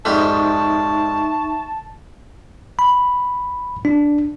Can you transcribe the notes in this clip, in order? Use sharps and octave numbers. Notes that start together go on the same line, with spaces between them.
F2 G#2 G3 D#4 E5 A5 C#6
B5
D4